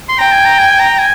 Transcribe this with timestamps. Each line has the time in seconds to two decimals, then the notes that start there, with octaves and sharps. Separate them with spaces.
0.09 C6
0.18 G5 A#5
0.32 G#5
0.45 A#5
0.59 G#5
0.79 A#5
0.99 G#5